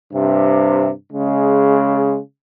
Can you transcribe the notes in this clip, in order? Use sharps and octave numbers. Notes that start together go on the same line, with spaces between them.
G2 C3
C#3 G#3